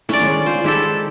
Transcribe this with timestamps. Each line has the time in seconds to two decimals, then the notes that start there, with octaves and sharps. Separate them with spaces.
0.09 A3 C#4 D4 E4 D5
0.21 D#3 G#3 C#5
0.46 F4 C5
0.64 D#3 G#3 D#4 E4 G4 A4